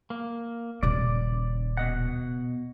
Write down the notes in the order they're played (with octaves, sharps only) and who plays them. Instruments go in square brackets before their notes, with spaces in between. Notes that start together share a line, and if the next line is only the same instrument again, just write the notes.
[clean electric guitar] A#3
[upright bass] D#1 C#3 [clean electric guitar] D5
[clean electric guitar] B2 D#5 F#5